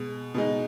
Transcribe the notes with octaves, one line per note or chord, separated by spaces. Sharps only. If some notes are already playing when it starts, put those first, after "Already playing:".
Already playing: B2 G#3
B2 G#3 D#4